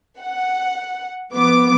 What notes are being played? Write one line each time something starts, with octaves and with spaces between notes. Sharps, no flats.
F#5
F3 B3 D6